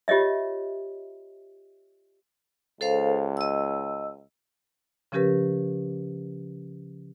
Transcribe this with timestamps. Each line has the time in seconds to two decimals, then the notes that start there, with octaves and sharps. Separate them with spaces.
0.08 F4 G4 C#5 D#5 E5
2.81 C#2 A4 C5 F5
3.37 D#5 E6
5.12 C#3 F3 C#4 G4 A#4 B4